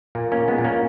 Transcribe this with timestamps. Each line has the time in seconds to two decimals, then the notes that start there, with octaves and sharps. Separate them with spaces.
0.15 A#2 A#3
0.32 A#3 C#4
0.37 A#2
0.48 G#3 B3
0.58 A#2
0.64 A#3 C#4